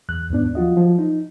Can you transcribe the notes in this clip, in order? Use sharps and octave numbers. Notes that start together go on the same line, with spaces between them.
E2 F#6
D#2 G#2 B3 D4
F3 F4 F#4 D#5
F3
D#4